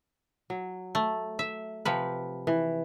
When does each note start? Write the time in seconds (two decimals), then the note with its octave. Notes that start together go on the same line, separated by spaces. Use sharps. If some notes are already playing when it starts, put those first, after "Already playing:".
0.50 F#3
0.95 A3
1.39 E5
1.85 C3 F3 B4
2.47 E3